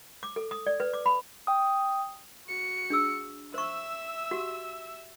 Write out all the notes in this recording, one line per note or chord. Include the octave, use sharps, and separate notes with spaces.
D6
A4
D#6
D5
B4
D6
B5
G5 D#6
F#4 C#7
D4 G#4 E6
C5 E5 C#6 E6
F#4 G4 F#5